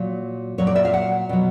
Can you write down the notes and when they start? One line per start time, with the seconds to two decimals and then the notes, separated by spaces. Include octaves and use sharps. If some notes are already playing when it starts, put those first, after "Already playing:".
Already playing: A#2 F#3
0.58 A#2 F#3 C#5
0.67 D5
0.76 E5
0.85 F5
0.94 F#5
1.29 B2 F#3